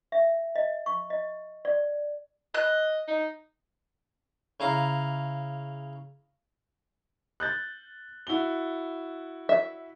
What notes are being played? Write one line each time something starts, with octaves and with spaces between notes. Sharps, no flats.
E5
D#5
C#6
D#5
D5
D#5 F#6
D#4
C#3 E4 F5 A#5
F#6 G6 A6
E4 F#4 G7
E5